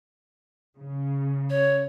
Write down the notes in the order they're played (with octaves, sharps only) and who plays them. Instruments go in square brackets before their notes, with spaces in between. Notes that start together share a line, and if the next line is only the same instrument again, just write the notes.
[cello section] C#3
[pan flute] C#5